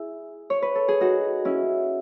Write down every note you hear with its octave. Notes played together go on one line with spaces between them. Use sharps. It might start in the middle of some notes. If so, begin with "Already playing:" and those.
Already playing: E4 G#4
C#5
B4
A4
G#4
D#4 F#4
C#4 E4